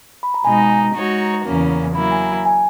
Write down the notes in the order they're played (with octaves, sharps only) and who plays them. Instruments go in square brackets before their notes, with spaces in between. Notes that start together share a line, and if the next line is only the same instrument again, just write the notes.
[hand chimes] B5
A#5
[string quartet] B2 G#3 D#4 [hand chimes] G#5
[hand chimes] A#5
[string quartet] G#3 D#4 F#4 C#5
E2 C#3 E3 A#3 C#4
[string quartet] F#3 A#3 E4 [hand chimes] B5
[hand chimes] G#5
A#5
G#5